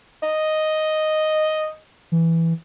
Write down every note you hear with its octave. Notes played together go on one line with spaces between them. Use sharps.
D#5
E3